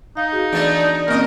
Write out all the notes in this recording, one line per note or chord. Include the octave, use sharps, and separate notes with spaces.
D#4 F5
F#4 G#4
E3 A3 B3 D4
A#2 A#3 C4 C#4 A#4 D#5